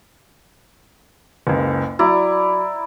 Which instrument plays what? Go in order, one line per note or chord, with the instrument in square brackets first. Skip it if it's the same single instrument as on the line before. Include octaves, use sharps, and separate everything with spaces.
[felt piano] F#1 C#2
[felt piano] F#3 [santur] E4 D5 A#5